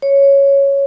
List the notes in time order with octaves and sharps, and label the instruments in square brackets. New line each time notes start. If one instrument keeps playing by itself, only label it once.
[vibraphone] C#5